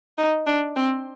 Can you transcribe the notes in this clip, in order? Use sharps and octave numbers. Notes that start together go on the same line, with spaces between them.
D#4
D4
C4